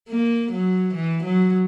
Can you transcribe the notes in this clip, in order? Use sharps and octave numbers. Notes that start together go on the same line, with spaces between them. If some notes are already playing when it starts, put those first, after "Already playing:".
A#3
F#3
E3
F#3